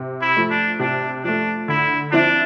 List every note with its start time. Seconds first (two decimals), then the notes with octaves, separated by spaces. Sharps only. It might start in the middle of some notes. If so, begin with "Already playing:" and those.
Already playing: C3
0.21 E4
0.36 F3 A3
0.51 D4
0.79 C3 D4
1.24 F3 A3 D4
1.68 D3 E4
2.11 F3 C4 D4 E4